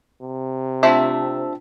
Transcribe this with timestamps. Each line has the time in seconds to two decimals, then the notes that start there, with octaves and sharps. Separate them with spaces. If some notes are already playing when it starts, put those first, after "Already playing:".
0.23 C3
0.83 A3 C4 D4 F4 E5 A5